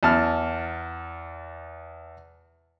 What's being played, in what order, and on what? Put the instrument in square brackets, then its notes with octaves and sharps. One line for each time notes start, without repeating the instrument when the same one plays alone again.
[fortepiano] E2 A5 F6